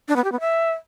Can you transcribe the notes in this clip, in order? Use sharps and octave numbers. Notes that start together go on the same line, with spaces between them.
D4
B3
G4
B3
E5